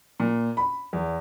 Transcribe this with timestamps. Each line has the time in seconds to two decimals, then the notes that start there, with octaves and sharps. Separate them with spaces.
0.20 A#2
0.57 B5
0.93 E2